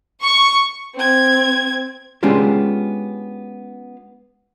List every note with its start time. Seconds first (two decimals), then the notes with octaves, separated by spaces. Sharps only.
0.22 C#6
0.95 C4 G#6
2.23 G#3 B3 C#4 D4 F4 G4